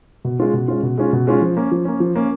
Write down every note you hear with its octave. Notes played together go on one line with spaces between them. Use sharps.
B2
G#3 C#4 F4
B2
G#3 C#4 F4
B2
G#3 C#4 F4
B2
G#3 C#4 F4
F3
A#3 C#4
F3
A#3 C#4
F3
A#3 C#4